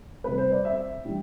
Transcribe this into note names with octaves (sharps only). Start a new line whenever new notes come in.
C3 G3 C4 B4
C5
D5
E5
E3 G3 D4